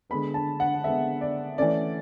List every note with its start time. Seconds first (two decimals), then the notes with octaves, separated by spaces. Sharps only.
0.10 D3 G#3 B3 B5
0.34 A5
0.60 F#5
0.84 D3 G#3 B3 E5
1.21 D5
1.58 E3 A3 C#4 D5